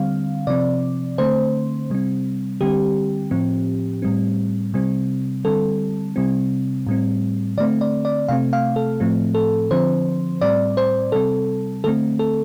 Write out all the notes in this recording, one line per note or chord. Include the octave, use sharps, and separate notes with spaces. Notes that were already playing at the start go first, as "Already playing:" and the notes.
Already playing: D3 G3 C4 F5
C3 F3 C4 D5
D3 A3 C4 C5
C3 G3 C4
D3 G3 C4 G4
A2 F3 C4
A2 G3 C4
C3 G3 C4
D3 G3 C4 A4
C3 G3 C4
A2 G3 C4
D3 A3 C4 D5
D5
D5
C3 A3 C4 F5
F5
A4
A2 F3 A3 C4
A4
D3 F3 C4 C5
A2 G3 C4 D5
C5
C3 G3 C4 A4
D3 A3 C4 A4
A4